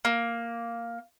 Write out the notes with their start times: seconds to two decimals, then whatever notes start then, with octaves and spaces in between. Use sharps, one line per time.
0.05 A#3